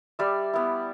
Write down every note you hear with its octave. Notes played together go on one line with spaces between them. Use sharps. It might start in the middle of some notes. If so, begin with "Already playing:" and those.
G3 D5 E5
B3 E4